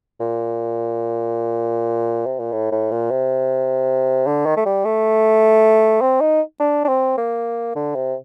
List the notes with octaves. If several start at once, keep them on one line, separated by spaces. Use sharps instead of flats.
A#2
C3
A#2
A2
A2
A#2
C3
D3
D#3
A3
G3
A3
C4
D#4
D4
D4
C4
A#3
D3
C3